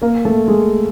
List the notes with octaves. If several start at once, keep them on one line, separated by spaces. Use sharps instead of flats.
A#3 A#4
A3 A4
G#3 G#4